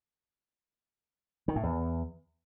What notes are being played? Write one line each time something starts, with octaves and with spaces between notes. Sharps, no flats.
D#3
A2
E2